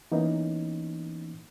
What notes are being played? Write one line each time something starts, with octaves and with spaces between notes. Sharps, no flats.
E3 A#3 B3 C#4 D#4